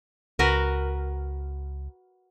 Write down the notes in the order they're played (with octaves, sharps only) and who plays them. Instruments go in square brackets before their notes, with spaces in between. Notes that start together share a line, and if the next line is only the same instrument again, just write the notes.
[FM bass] C#2 [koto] F#4 A#4 B4